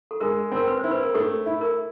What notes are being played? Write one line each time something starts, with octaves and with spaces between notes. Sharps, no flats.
A4
G#3 A#4
C4 A#4
B4
E4 C5
B4
A#4
A3 A4
E4
A#4